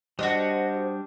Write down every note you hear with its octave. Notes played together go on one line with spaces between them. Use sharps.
G3 D4 F#4 C5 D#5